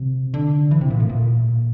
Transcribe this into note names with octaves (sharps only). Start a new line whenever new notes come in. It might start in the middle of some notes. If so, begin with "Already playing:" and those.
Already playing: C3
D3
E3
C3
A#2
A2
A#2